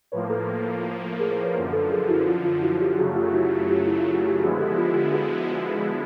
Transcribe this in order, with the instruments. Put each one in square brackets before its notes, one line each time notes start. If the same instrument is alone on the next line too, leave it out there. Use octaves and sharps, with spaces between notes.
[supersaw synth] A2 F3 A#3 [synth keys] B4 C#5
[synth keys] A4 B4
G#4 A#4
A#4 C5
B4 C#5
[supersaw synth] F#2 D3 F3 [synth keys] A#4 C5
[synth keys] A4 B4
G#4 A#4
E4 F#4
F4
F4
E4 F#4
F4 G4
[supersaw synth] F#2 C#3 F#3 A3 [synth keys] F#4 G#4
[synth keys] F4 G4
E4 F#4
F4 G4
E4
F4
F#4
G4
[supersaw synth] D3 F3 G#3 B3 E4 [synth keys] F#4 G#4
[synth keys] G4 A4
F4
F4 G4
F#4 G#4